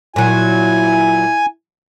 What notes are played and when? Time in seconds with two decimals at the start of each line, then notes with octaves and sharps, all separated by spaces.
0.16 A#2 F#3 E4 G#5